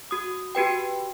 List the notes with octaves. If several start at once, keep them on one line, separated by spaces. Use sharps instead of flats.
F#4 D#6
F#4 G4 B4 G5